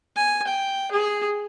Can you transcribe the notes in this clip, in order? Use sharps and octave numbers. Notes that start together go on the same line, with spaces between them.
G#5
G5
G#4